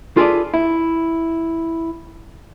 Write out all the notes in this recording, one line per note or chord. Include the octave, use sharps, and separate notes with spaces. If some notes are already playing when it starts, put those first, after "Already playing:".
F4 G#4 A4 B4 D5
E4